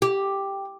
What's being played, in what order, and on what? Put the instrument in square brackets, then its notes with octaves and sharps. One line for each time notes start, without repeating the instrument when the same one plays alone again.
[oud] G4